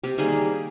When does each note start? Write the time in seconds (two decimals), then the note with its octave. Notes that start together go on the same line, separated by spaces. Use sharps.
0.04 C3 G4
0.18 D#3 G3 A#3 G#4